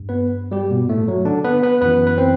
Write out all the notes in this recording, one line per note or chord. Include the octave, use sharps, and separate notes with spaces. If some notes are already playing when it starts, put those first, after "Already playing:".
Already playing: G2
B3 B4
G3 G4
B2 B3
A2 A3
F#3
D3 D4
B3 B4
B3 B4
F#2 E3 B3 B4
B4
C4 C5